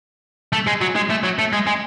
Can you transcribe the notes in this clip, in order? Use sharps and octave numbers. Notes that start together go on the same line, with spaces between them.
A3
G#3
F#3
G#3
A3
F#3
A3
G#3
G#3